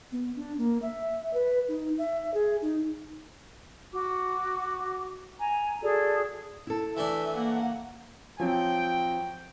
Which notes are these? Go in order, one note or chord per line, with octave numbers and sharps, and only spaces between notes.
B3
D4
A#3
E5
B4
D#4
E5
G#4
D#4
F#4 D6
G#5 A#5
F#4 G#4 A4 D5
E4 A4
E3 A3 D4 E5
A#3 F#5
F3 F#3 C4 G5